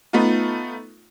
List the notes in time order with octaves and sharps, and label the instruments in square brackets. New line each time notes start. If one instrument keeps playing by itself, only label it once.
[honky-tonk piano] A3 B3 D#4 F4